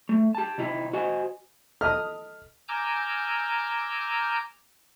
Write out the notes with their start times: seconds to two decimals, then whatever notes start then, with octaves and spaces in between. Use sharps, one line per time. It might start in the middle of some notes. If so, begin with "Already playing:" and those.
0.09 A3
0.35 G4 A5
0.58 C3 D#4 E4
0.93 F#4 C5 D#5 G#5
1.81 A4 D#5 D#6 F6
2.68 G#5 A#5 D6 E6 F6 G6